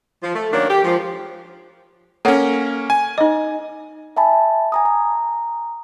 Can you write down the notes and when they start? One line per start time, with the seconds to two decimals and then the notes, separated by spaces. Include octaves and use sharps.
0.23 F3
0.35 A3
0.53 D#3 F#3 A#3 C#4 D4
0.70 G4
0.84 G#2 F3
2.25 A#3 C#4 A4 C#5 F#5
2.90 G#5
3.18 D#4 D#5
4.17 E5 G#5 A5 B5
4.72 G#5 A#5 D#6
4.85 A#5